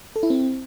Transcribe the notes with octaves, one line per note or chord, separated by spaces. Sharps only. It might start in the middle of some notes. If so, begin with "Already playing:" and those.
A4
E4
C4